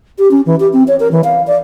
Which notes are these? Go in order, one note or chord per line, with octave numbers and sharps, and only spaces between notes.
G4
C#4
E3
G4
C4
C#5
A#4
E3
F5
D5